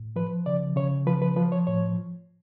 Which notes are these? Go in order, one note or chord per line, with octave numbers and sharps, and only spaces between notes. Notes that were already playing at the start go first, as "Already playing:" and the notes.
Already playing: A2
F3 B4
C#3 D5
C#3 C#5
F3 B4
B4
F3 B4
C#5
A2 C#5